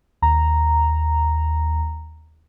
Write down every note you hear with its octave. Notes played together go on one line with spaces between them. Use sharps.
D#2 A#5